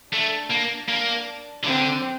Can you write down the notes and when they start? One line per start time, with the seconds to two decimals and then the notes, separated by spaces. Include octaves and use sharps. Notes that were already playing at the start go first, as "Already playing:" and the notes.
0.13 A3 D4
0.51 A#3
0.89 A#3
1.64 D3 C4